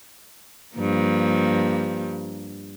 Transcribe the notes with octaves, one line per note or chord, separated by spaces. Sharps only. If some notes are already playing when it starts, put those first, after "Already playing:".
G2 F3 A#3